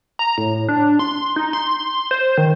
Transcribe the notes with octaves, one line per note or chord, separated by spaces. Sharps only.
A#5
A2
D4
C6
D#4
C6
C5
D#3